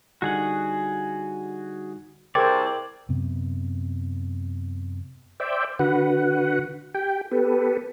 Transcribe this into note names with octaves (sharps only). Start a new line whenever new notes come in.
D3 G3 D#4 F#4 G#4 F#5
C2 G#4 A#4 C5 D5 G5 E6 G#6
F#2 C3 B3
C5 D5 E5 G5
D3 F#4 B4 F#5
G4 G5
B3 G4 A4 B4